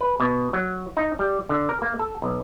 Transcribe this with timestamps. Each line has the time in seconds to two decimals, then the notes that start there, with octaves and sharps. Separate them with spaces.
0.01 B4
0.20 B2
0.53 F#3
0.97 D#4
1.19 G3
1.49 D3
1.69 A#4
1.82 A#3
1.99 A4
2.22 B1